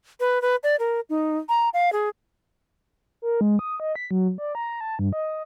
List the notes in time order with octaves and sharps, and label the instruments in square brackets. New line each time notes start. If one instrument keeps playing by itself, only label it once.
[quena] B4
B4
D5
A#4
D#4
A#5
F5
G#4
[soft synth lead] A#4
G#3
D#6
D#5
B6
F#3
D5
A#5
A5
G2
D#5